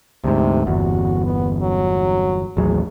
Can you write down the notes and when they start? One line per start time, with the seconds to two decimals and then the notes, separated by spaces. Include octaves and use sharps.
0.24 D2 G#2 C3
0.67 G1 E2 F#4
1.25 B3
1.61 F#3
2.57 A1 D#2 F#3 G#4